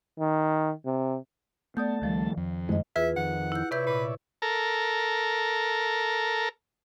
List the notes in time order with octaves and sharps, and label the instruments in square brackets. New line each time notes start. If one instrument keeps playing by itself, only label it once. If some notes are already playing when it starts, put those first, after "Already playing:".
[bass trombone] D#3
C3
[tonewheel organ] A3 A5 [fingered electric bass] B3 [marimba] D5 D#6 G6
[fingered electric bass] C#2 G3 [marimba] D#3 F3
[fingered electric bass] F2
[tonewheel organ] F#2 D#3 [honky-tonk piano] G#3 [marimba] C5 D#5
[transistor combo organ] E2 [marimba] F4 G#4 B4 [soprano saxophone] E5
[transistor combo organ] F2 D#3 [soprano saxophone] F#5
[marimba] E4 G6
[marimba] C3 B4 G6 [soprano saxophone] E4 [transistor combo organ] C#5 D5 E5
[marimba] A#2 [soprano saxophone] B4
[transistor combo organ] A4 A#4